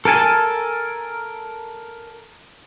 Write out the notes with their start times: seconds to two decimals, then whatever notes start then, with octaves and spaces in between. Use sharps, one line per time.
0.05 A4 A#4 G#5 A5